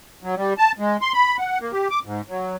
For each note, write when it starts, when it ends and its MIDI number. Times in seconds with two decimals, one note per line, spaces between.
0.23 0.35 54
0.37 0.53 55
0.58 0.72 81
0.79 0.97 56
1.01 1.13 84
1.13 1.37 83
1.39 1.59 78
1.60 1.72 58
1.72 1.88 67
1.90 2.00 86
2.05 2.22 44
2.29 2.56 54